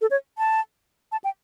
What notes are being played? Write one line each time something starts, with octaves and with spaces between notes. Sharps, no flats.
A4
C#5
A5
A5
G5